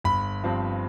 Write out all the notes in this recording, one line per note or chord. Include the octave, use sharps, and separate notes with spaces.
G1 B5
G2 F3 C4